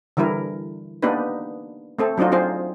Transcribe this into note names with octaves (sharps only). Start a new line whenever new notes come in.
D3 E3 G3 E4 A#4
A#3 B3 D4 D#4 G4 B4
A3 C4 A4
F#3 C4 D4 D#4 F4
C4 F4 G#4 C5